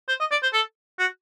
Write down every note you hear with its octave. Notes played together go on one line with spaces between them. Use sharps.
C5
D#5
D5
C5
A4
F#4